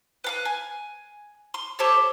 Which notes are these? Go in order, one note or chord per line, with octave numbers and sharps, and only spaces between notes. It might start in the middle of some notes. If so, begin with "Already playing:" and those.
B4 F5 F#6
G#5
C6
G4 A4 C5 C#5